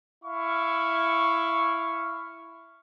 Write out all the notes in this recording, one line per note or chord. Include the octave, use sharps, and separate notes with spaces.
E4 F5 C#6